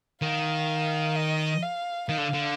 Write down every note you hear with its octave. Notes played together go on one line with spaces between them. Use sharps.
D#3 F5
D#5
F5
D#3 F5
D3
D3